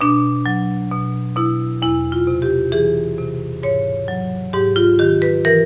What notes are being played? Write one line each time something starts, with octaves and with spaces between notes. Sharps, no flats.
B2 D4
F#3
B2
B2 E4
E2 E4
F4
C3
G4
E3 G#4
C3
G#2 C#5
F#3
G#2 G4
F4
D#3 G4
B4
E3 A#4